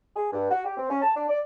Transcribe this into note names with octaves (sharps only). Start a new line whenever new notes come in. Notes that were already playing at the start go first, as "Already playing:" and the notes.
G#4
G2
F#4
G4
C4
C#4
A5
D4
D5